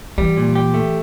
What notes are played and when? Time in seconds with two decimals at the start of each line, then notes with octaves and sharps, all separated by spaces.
0.18 E3 G3
0.37 A#2
0.55 G4
0.74 A3